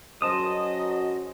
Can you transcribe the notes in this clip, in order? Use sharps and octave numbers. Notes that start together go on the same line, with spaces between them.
F#2 F#3 G#4 C5 D#5 A5 D#6